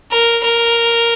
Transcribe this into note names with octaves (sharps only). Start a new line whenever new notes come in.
A#4
A#4